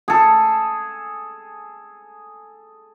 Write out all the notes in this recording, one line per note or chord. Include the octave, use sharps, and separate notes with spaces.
G#4 A4